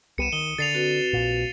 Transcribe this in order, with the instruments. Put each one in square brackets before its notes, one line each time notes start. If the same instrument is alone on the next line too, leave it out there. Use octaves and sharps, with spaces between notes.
[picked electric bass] C2 G3 B3 [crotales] C#7 D#7 E7
[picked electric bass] D#3 [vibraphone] D#6 [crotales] G7
[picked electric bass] D3 [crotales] A6 C7 F7
[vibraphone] C4 F#4 B4
[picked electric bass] A#1 A#2